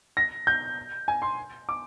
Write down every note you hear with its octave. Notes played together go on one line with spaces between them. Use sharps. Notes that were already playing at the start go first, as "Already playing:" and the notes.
A#6
G6
G#5
C6
D6